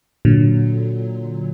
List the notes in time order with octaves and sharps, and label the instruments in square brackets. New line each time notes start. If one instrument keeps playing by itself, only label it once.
[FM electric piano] A#2 D3 F#3